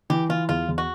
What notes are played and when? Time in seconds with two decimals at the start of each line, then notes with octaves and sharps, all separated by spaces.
0.10 E3 G4
0.29 E3 F4
0.49 E2 F4
0.68 E2
0.78 F#4